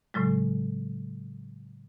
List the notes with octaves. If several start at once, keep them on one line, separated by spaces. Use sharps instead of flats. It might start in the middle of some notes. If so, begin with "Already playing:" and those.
A2 C#3 F#3 G#3